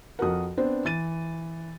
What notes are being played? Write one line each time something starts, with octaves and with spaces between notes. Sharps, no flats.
F2 F#4 A#4 F#5 D#6
B3 C4 D4 C5
E3 A6 D#7